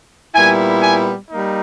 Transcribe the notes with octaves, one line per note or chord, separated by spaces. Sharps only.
A#2 G3 B3 E4 G#5
G#5
G3 A#3 D#4